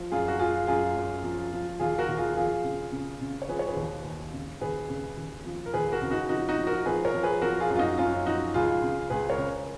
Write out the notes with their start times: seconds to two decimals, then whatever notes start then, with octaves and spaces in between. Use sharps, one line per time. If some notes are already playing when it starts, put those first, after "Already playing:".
Already playing: F3
0.12 F#2 F4 G#4
0.28 F#4
0.39 F#2 F4 G#4
0.67 F#2 F4 G#4
0.96 F#2
1.24 F3
1.53 F3
1.80 D#2 F4 G#4
1.98 F#4 A#4
2.09 D#2
2.17 F4 G#4
2.36 F3 F4 G#4
2.64 C#3
2.92 C#3
3.21 C#3
3.42 C#5
3.49 F3 G#4 B4
3.59 C#5
3.67 G#4 B4
3.76 D#2
4.04 D#2
4.33 C#3
4.61 D#2 G#4 B4
4.89 C#3
5.17 D#2
5.45 F3
5.66 A#4
5.74 D#2 G#4 B4
5.92 F#4 A#4
6.02 C#3
6.10 D#4 F#4
6.29 F3 D#4 F#4
6.49 D#4 F#4
6.58 F3
6.67 F#4 A#4
6.86 F3 G#4 B4
7.05 A#4 C#5
7.14 F3
7.23 G#4 B4
7.42 F3 F#4 A#4
7.60 F4 G#4
7.70 F#2
7.75 F4
7.79 D#4 F#4
7.98 F#2 C#4 F4
8.26 F3 D#4 F#4
8.54 C#2 F4 G#4
8.83 C#3
9.10 C#2 G#4 B4
9.30 A#4 C#5
9.38 C#3